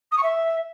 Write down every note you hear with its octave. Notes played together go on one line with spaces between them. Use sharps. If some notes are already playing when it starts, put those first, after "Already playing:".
D#6
C#6
E5